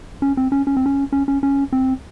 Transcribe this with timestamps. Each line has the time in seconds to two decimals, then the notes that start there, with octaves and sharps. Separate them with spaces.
0.22 C#4
0.37 C4
0.52 C#4
0.67 C#4
0.77 C4
0.86 C#4
1.12 C#4
1.28 C#4
1.43 C#4
1.72 C4